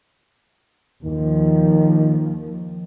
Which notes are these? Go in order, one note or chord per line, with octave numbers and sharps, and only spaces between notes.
D#2 D#3 F3